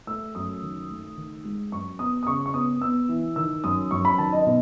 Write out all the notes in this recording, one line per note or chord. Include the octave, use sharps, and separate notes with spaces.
A3 E6
F#2 D#6
D#3
A3
D#3
G#3
F#2 C#6
B3 D#6
D#6
C#3 C#6
C#6
B3 D#6
B3 E6
E3
D#3 E6
F#2 D#6
F#2 C#6
B5
D#3 A5
D#5
B2